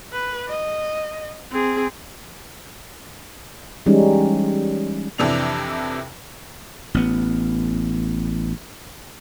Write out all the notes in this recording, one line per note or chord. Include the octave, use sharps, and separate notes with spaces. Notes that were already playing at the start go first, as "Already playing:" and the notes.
B4
D#5
C4 G#4
E3 G3 G#3 C#4 D#4
F2 C3 E3 D4 F7
A1 B3